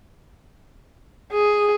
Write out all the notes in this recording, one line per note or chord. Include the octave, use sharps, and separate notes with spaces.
G#4